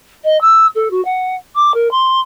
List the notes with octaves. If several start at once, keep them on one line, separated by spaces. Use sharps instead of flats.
D#5
E6
A4
F#4
F#5
D6
A#4
C6